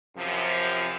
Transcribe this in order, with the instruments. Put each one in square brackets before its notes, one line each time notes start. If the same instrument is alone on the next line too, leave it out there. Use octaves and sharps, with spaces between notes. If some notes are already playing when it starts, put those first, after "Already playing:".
[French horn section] F#2 C3 F3